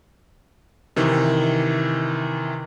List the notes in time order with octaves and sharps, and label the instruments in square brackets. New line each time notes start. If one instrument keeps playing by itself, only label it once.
[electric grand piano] C3 D#3 E3